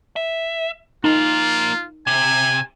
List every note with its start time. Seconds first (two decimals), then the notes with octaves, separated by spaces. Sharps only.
0.16 E5
1.04 F3 A#3 D#4 F4
2.07 C3 G#5